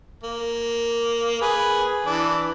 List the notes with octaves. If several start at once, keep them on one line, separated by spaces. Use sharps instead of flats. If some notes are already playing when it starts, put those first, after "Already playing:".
A#3
G#4 B4
E3 D4